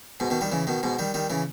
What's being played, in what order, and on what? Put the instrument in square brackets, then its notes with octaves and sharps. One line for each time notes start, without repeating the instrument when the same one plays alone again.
[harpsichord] G#2 B2
B2 D#3
D#3 G3
C#3 E3
B2 D#3
G#2 B2
D#3 G3
D#3 G3
C#3 E3